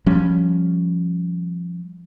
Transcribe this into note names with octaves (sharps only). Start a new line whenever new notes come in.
F3 G3 C#4